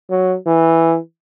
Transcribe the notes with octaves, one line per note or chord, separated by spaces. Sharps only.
F#3
E3